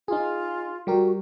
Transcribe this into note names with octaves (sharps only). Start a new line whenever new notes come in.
D#4 F4 G#4
G3 F#4 G4 A#4